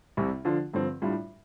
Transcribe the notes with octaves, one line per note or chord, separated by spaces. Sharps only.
C2 C3 G3
D3 F3 D4 F4
G2 D3 F3 C4
A2 G3 D4 F4